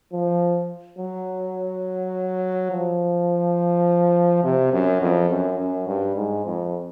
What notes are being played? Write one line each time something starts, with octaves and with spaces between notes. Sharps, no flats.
F3
F#3
F3
C3
F#2
F2
F#2
F#2
G2
G#2
F2